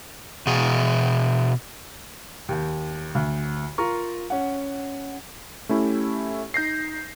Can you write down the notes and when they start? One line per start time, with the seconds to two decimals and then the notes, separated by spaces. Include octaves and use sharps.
0.47 B2 G#4
2.49 D#2 G5
3.15 D2
3.78 F4 A#4 F5 A#5 C#6
4.30 C#4 F#5
5.69 A3 C#4 E4 G4
6.54 D#4 G6 A#6 C7